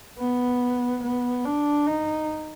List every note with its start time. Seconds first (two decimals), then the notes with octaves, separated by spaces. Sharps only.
0.18 B3
1.03 B3
1.45 D4
1.87 D#4